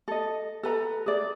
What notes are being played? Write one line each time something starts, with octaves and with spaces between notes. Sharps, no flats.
A4 D#5
A4 B4 A#5
G#4 D5